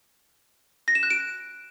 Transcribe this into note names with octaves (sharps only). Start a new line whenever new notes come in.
A#6
E7
F#6
D7